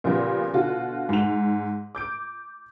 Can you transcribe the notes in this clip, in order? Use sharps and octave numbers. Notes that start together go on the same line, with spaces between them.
A#2 C#3 F3 G3 B3
B2 D3 F4 F#4
G#2 F7
D6 G6 D7